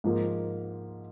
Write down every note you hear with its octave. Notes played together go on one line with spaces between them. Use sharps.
G#2 F3 A#3